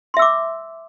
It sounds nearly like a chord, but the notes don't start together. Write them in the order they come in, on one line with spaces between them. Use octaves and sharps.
C6 E5 E6 D6